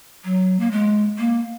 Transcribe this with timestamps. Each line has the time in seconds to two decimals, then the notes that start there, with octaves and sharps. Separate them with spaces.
0.25 F#3
0.60 A#3
0.71 G#3
1.18 A#3